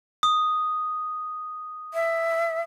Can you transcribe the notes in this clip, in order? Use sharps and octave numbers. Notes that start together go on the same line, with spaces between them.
D#6
E5